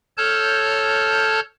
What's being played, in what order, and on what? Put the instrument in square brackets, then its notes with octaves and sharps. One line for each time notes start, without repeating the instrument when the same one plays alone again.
[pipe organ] A4 C#5 A5 F6 G6